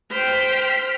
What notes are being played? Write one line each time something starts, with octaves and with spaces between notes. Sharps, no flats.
C5 G5 F6 B6